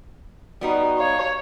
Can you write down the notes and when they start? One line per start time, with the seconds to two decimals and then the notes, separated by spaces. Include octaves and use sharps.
0.61 G3 B3 D#4 F#4
0.99 C#5 F5